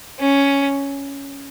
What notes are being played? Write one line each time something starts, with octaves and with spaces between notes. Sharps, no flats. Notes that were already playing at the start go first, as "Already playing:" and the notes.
C#4